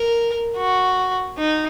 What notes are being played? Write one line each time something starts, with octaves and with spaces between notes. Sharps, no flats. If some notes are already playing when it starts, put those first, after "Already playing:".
Already playing: A#4
F#4
D#4